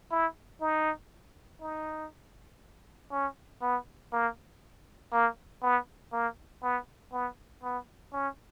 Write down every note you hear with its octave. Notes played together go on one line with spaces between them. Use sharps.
E4
D#4
D#4
C#4
B3
A#3
A#3
B3
A#3
B3
B3
B3
C#4